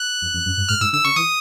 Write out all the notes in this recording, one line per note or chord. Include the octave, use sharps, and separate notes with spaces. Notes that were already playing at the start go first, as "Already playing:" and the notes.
Already playing: F#6
F2
F2
F#2
G2
G#2 F6
G#2 E6
D3 E6
C#3 C#6
E3 D#6